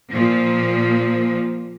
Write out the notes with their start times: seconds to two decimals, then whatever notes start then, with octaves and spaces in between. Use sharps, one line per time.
0.11 A#2 F3